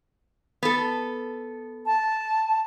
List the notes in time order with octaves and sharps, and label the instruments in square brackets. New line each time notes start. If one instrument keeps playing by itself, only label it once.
[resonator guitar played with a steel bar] B3 A4
[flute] A5